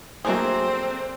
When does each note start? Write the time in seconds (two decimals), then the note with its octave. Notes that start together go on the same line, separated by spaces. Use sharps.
0.25 F#3 A3 A#3 C4 D4 G#4 C5